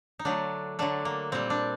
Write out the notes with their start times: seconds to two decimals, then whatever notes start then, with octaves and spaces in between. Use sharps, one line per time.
0.19 D#4
0.25 D3 F#3 A3 D4
0.79 D3 F#3 A3 D4
1.05 A#3
1.32 A#2 G3 C4
1.50 D4